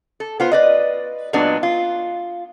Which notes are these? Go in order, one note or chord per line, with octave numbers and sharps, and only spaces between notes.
A4
B3 F4 C5
B4 D5 D#5
A#2 F#3 G#3 B3 D4
F4